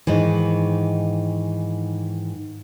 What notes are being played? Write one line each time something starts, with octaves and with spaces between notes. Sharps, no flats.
G#2 D#3 E3